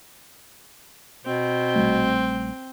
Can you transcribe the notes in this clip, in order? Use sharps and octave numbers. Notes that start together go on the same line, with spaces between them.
B2 C4
A#1 G3 A3